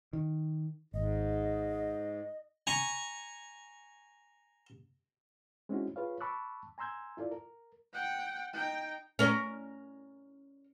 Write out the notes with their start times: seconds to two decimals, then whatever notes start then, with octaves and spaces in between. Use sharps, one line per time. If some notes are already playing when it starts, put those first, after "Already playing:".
0.13 D#3
0.94 G#1 G#2 D#5
2.67 G#5 A#5 C#6
5.69 G#3 C4 C#4 D#4 E4 F#4
5.96 F4 G#4 B4 C#5 F5
6.21 A5 B5 C#6 D6 E6 F#6
6.78 G#5 A#5 C6 E6 G6 G#6
7.17 E4 F4 A4 D5
7.31 A#4
7.93 F#5 G5
8.53 D#4 G5
9.19 C#4 A#4